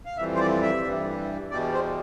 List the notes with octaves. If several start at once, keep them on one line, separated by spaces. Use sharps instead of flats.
F5
F2 E3 G3 E5
C5
D5
E5
G2 E3 G3
E2 B2 G3 D5
C5